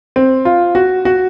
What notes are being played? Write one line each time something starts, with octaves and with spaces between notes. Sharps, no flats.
C4
F4
F#4
F#4